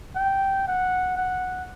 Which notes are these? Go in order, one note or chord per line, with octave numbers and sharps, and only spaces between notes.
G5
F#5
F#5